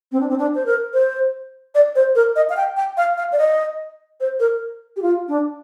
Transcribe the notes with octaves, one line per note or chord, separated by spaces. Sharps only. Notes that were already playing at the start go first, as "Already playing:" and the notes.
C4
D4
C4
D4
C5
A#4
C5
D5
C5
A#4
D#5
F5
G5
G5
F5
F5
D5
D#5
C5
A#4
G4
F4
D4